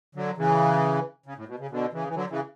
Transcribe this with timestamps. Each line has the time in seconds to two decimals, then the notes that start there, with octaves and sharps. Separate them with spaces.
0.15 D3 F#3
0.37 C#3 E3
1.26 C#3
1.37 A2
1.48 B2
1.59 C#3
1.71 B2 D3
1.93 C#3 E3
2.08 E3
2.15 D3 F#3
2.30 C#3 E3